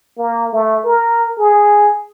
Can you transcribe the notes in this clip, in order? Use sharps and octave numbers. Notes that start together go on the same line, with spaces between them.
A#3
A3
A#4
G#4